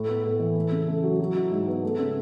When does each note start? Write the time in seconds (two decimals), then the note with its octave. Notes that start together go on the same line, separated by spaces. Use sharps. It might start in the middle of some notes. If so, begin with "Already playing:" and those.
Already playing: A2
0.08 B3
0.24 A2
0.39 E3
0.56 A3
0.72 C#3
0.88 A3
1.03 F#3
1.19 F#3
1.36 E4
1.51 G#2
1.68 B3
1.83 A3
1.99 C#3